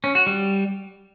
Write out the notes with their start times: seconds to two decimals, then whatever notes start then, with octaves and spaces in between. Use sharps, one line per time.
0.04 C#4
0.15 F#4
0.27 G3